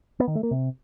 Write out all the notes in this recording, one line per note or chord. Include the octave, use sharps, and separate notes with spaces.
B3
D#3
A3
A#3
C3